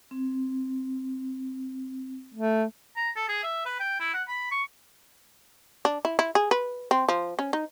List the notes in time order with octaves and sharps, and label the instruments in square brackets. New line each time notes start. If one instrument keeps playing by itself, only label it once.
[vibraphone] C4
[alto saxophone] A3
[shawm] A#5
A4
G#4
E5
B4
G5
E4
F#5
B5
C#6
[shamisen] D4
E4
E4
G#4
B4
C4
F3
C#4
D#4